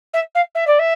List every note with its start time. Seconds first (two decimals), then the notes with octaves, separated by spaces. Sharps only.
0.14 E5
0.35 F5
0.55 E5
0.67 D5
0.79 E5